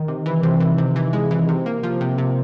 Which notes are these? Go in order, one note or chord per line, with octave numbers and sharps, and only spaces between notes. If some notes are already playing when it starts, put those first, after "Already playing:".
Already playing: D#3
C3
E3
C3
E3
C3
E3
G#3
E3
C3
A#3
F3
C3
C3